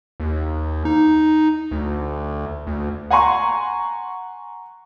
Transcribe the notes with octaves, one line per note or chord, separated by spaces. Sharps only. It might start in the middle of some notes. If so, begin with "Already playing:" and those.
D#2
D#4
D2
D2
F#5 G#5 A#5 C6 C#6